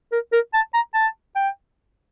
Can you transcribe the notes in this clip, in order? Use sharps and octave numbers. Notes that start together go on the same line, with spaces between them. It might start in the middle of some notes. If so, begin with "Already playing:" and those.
A#4
A#4
A5
A#5
A5
G5